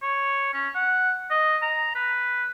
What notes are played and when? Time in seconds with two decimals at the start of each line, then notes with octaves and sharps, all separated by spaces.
0.02 C#5
0.53 C#4
0.75 F#5
1.30 D#5
1.62 A#5
1.95 B4